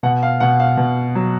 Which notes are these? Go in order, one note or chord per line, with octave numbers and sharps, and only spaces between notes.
B2 F#5
F5
B2 F#5
F5
B2
F#3